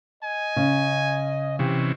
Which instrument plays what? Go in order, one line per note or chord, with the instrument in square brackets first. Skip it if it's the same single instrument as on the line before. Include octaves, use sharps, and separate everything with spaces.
[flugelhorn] D#5 [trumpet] G#5
[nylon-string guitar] C#3
[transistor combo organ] C3 E3 C#4 [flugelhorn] G4